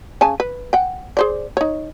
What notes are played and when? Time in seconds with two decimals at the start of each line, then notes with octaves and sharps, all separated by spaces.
0.21 C#3 G#5 A5
0.40 B4
0.73 F#5 G5
1.17 G#4 C5 D5
1.57 D#4 C#5